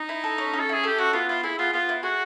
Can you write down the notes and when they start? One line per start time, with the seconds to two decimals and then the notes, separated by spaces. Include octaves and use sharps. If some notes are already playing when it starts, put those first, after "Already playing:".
Already playing: D#4
0.09 E4
0.24 A4
0.38 C#4
0.53 C#4
0.60 A4
0.69 E4 G#4
0.83 G4 A4
0.98 C#4 F#4
1.13 B3 F4
1.29 E4 F4
1.43 E4 G#4
1.59 B3 F4
1.73 B3 F4
1.89 E4
2.03 F#4 G#4